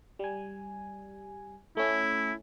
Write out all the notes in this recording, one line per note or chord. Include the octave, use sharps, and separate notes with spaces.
G3 G#5
A3 C#4 E4